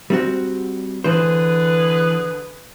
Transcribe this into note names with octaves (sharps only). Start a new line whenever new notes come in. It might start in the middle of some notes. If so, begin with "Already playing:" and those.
G3 C4 F#4
D3 E3 G#4 B4 C5